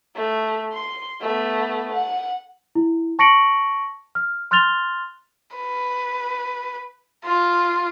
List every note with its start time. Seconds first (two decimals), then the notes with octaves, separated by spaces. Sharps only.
0.16 A3
0.72 C6
1.21 A3 B3
1.92 F#5
2.75 E4
3.19 A5 C#6 A#6 C#7 D7 F#7
4.15 F6
4.51 C6 F6 F#6 A6 F7 G7
5.57 B4
7.25 F4